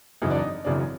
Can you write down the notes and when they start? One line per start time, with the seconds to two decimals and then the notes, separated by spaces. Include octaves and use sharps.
0.22 G#1 F#2 C#3 E3 D#4
0.31 D4
0.39 D#4
0.64 G#1 F#2 C#3 E3 D4